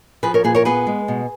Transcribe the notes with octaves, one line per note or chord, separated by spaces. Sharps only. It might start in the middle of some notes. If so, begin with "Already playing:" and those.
F3 G#4 B4
A#4 C#5
A#2 G#4 B4
A#4 C#5
B3 G#4 B4
G#3
B2